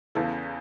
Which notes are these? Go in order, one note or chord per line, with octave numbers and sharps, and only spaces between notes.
E2 C#3 E3 A4